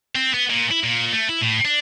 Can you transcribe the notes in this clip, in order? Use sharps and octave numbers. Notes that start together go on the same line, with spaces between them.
C4
B3
A#2
E4
A#2
A3
E4
A2
D4